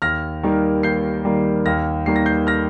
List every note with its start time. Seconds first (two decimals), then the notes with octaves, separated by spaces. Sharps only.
0.02 D#2 F6 A#6
0.43 D#3 G3 A#3
0.83 D#2 G6 C7
1.25 D#3 G3 A#3
1.65 D#2 F6 A#6
2.06 D#3 G3 A#3 C7
2.16 A#6
2.26 G6 C7
2.47 F6 A#6